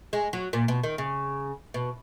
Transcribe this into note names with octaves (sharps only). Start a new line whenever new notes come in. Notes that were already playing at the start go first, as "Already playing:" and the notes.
G#3
F#3
A#2
B2
D#3
C#3
B2